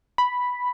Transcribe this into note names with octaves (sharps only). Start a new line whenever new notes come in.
B5